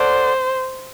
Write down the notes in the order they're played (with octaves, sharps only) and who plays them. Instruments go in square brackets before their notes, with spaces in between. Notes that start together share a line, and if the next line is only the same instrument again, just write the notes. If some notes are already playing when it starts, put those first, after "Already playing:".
Already playing: [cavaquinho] A4 D5 F#5 [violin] C5